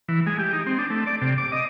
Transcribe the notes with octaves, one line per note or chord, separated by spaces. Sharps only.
E3
G#3
G4
D#4
C4
D4
A3
D5
C3
D6
D#5